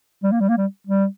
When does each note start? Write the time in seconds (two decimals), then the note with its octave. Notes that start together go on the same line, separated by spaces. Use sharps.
0.23 G3
0.32 A#3
0.40 G3
0.49 A#3
0.57 G3
0.87 G3